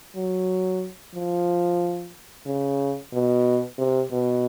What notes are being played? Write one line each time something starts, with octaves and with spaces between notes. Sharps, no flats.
F#3
F3
C#3
B2
C3
B2